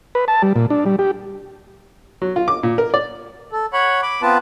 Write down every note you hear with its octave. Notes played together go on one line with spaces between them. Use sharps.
B4
A5
G3
A#2
D4
G3
G4
F#3
F4
D6
A#2
A#4
D5
A4
C#5 F#5 B5 C#6
B5 D6
B3 C4 F4 B4 A5